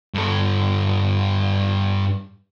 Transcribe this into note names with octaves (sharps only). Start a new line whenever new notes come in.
G2 A4